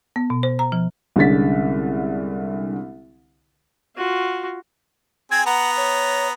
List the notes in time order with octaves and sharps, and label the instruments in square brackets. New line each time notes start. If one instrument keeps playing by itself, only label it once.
[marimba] B3
B2
C5
A#5
F3
[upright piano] C2 D3 G#3 C#4 A6 B6
[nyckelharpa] F4 F#4
[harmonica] C4 G#4 [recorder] G#6
[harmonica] B3 A#5 [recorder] F#5
[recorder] C#5